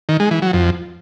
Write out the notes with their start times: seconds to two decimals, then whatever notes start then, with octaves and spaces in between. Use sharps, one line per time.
0.09 D#3
0.20 G#3
0.31 E3
0.42 F#3
0.53 F2